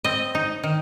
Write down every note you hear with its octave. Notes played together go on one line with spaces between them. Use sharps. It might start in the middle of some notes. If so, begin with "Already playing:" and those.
C4 D#5
D#4
D#3